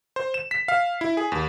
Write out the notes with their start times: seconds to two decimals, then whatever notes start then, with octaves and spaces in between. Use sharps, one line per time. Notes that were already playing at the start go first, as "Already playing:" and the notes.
0.16 C5
0.34 E7
0.51 B6
0.68 F5
1.01 E4
1.17 G#4
1.32 D#2